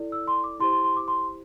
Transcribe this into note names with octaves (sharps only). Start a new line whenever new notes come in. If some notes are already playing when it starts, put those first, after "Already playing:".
Already playing: E4 A4 D5
E6
C6
D6
E4 G4 C5 C6
C6
C6
D6
C6